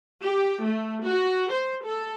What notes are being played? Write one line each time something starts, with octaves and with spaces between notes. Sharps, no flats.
G4
A3
F#4
C5
A4